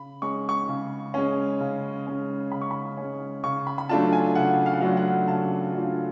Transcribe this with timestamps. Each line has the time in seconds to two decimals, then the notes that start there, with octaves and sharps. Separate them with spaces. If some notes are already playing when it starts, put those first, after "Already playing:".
Already playing: C#3 B5
0.22 G#3 C#4 C#6
0.49 C#6
0.69 C#3
1.14 G#3 C#4
1.60 C#3
2.07 G#3 C#4
2.52 C#3 B5
2.61 C#6
2.71 B5
2.97 G#3 C#4
3.43 C#3 C#6
3.67 B5
3.78 B5
3.89 F#3 A3 D4 F4 A5
4.13 G#5
4.35 C#3 F#5
4.66 F5
4.73 F#5
4.80 F#3 A3 D4 F4 F5
4.97 F#5
5.27 C#3 A5
5.73 F#3 A3 D4 F4